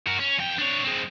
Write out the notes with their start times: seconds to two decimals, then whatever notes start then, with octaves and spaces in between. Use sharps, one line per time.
0.07 F#4 A#4
0.20 C#4
0.38 F2 G5
0.58 D4 C#5
0.84 G#3 C4